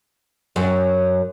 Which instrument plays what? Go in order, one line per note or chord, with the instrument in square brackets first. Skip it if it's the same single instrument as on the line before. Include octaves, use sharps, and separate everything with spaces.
[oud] F#2